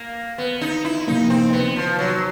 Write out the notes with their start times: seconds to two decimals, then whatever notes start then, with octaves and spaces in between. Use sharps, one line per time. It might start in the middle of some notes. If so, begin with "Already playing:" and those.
Already playing: A#3
0.38 B3
0.61 D#4
0.85 E4
1.07 C3 F3 A#3 D#4
1.30 C4
1.53 B3
1.76 F3
1.99 F#3